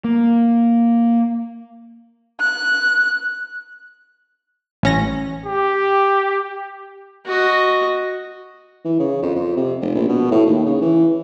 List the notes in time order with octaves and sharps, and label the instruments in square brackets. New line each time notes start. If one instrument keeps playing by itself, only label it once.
[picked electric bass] A#3
[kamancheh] F#6
[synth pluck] A1 C#4 A#6
[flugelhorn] G4
[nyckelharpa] F#4 D#5
[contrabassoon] E3
C#3
F2
F2
C3
F1
A#1
B2
A2
D#2
C#3
E3